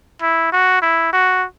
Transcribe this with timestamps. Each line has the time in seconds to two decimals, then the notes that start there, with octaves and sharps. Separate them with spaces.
0.22 E4
0.52 F#4
0.82 E4
1.13 F#4